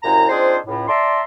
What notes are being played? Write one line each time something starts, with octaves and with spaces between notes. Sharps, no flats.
C2 F#2 A#2 E4 A#5
C4 D4 D#4 F4 G#4 C5
C#2 A2
D5 E5 A5 A#5 C6